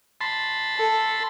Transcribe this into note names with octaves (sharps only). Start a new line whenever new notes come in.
A5 B5 C6
A4